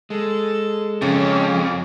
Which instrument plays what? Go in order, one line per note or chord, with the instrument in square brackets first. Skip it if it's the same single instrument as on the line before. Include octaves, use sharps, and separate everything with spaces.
[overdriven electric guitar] G#3 [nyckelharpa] A4
[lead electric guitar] F2 [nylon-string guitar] C#3 [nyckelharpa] C#4